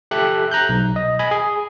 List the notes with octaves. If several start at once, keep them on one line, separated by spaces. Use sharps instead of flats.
G4 A4 E5 F#6
A#5 F#6 G6
B1
D#5
D#5 G#5 B5
G#4